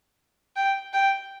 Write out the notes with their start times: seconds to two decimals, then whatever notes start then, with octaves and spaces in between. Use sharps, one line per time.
0.56 G5
0.93 G5